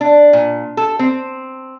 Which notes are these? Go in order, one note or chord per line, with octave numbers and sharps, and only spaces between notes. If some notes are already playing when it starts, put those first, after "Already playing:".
D4
A#2
A4
C4